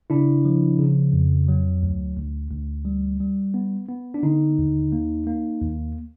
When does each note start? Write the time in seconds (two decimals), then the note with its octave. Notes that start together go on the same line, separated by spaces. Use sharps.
0.10 C#3 D4 E4
0.45 F3
0.79 C#3
1.13 F2
1.48 F#3
1.83 D2
2.16 D2
2.51 D2
2.85 G3
3.20 G3
3.54 B3
3.89 B3
4.14 D4
4.23 D3 D#4
4.59 D#2
4.92 A#3
5.27 A#3
5.62 D#2